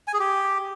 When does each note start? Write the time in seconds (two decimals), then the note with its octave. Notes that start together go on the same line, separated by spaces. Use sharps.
0.08 G#5
0.14 G#4
0.19 G4